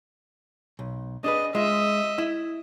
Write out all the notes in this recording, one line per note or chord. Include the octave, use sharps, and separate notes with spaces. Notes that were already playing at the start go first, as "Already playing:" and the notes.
B1
D4 G#4 B4 D#5
G#3 F4 D#5 E5
E4